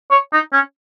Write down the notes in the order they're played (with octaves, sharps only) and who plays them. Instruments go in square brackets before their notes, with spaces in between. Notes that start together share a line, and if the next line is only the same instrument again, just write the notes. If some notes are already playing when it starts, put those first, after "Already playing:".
[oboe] C#5
D#4
C#4